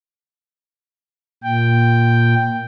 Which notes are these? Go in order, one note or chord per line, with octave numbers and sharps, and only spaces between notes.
A#2 G5